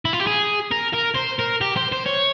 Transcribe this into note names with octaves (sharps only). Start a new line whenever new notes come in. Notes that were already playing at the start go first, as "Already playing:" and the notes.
E4
F4
G4
G#4
A#4
A#4
C5
A#4
G4
C5
C5
C#5